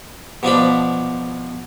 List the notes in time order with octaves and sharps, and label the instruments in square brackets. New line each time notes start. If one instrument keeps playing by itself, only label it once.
[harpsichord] B2 F3 D4 B5